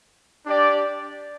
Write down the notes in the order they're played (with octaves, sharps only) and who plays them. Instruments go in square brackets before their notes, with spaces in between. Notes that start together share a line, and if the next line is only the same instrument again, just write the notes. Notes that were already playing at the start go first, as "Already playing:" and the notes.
[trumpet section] D4 G4 D5 G5